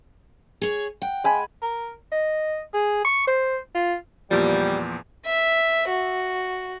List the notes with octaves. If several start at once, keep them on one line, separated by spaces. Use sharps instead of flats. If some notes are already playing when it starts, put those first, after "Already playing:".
G#4 C#5
F#5 G5
G#3 G#5 B5
A#4
D#5
G#4
C#6
C5
F4
E2 A#2 F3 G3
E5
F#4